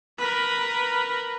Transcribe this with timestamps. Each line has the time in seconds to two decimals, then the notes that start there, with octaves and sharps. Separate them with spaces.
0.18 A#4 B4